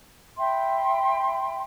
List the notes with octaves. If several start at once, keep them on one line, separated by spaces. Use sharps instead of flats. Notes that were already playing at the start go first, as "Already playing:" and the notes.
E5 G5 B5 C6